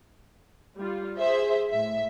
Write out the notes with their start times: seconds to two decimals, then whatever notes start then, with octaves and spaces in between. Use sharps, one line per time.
0.77 G3 F4
1.18 G#4 C5 E5
1.71 A2 E5